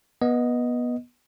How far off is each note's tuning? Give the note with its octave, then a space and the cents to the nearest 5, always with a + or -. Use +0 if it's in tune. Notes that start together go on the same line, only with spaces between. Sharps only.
B3 -20 D#5 +0